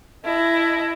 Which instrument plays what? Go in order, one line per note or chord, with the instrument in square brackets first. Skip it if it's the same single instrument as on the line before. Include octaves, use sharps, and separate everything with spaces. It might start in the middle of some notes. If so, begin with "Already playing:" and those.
[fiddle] E4 [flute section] D#5 A5 B5